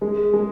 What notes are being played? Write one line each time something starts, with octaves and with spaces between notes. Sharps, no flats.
G#3
G#3